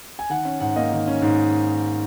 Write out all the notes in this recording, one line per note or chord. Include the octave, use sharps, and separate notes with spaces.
G#5
D#3 F#5
C#4
G#2 F#5
A#3 D#5
D#3
C#4
G#2